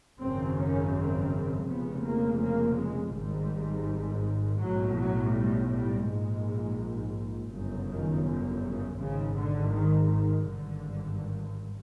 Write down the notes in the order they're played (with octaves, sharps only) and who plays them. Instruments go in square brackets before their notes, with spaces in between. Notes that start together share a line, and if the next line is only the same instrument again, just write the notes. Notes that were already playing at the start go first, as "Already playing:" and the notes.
[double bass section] G#1 F#2 C#3 C4
C#4
C4
F1 F2 C#3 B3
A#3
A#3
G#3
G#1 G#2 G3
B1 A2 F#3
F#3
G3
G3
A#1 G#2 G#3
G1 F#2 C#3
D#3
D3
C#3
G#1 G#2 C#3
D3
D#3
D#3
G#1 G2 D3